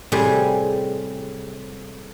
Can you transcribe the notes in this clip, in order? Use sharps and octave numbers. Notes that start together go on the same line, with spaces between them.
A2 C3 G3 C4 G#4